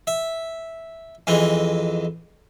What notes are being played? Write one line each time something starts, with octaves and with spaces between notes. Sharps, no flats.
E5
F2 E3 G#3